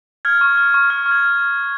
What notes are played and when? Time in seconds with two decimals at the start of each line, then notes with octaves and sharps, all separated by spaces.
0.25 F6 G#6
0.41 C#6
0.57 F6
0.74 C#6
0.90 F6
1.06 C#6
1.11 G#6